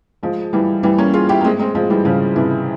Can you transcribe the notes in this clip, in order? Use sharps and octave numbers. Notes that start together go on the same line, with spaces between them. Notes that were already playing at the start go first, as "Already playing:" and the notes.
F3 G#3
E3 G3
E3 G3
A#3 C#4
F4 G#4
E4 G4
A#3
G#3 C4
G#3 C4
F3 G#3
E3 G3
C#3 F3
C3 E3